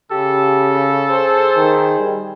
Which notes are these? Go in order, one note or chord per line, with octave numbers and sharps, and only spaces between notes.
C#3 G4 A4
G#4 C5
D#3
G3